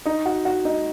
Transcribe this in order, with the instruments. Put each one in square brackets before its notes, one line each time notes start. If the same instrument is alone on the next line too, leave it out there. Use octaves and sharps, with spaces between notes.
[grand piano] D#4 D#5
F#4 F#5
F#4 F#5
D#4 D#5